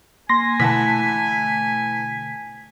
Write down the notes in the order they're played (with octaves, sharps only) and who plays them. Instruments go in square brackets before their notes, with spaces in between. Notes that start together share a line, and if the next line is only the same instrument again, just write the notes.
[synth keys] A#3 [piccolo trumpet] G#5 [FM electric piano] C6 A#6
[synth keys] B2 D3 A3 [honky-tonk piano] E3 F#5 A5 [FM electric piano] B6